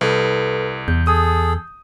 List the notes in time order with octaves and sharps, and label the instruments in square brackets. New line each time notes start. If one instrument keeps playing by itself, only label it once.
[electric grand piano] C2 [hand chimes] A4 B4
[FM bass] E2 [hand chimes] G6
[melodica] G#4 A4 [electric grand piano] D#6